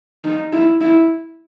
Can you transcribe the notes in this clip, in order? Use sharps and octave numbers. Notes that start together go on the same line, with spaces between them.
D#4
E4
E4